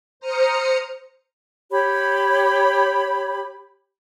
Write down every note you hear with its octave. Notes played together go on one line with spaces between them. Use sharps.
C5 A#5 D#6 F6 C#7
G4 C#5 B5